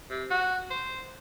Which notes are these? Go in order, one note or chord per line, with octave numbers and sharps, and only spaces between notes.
C3
F#4
C5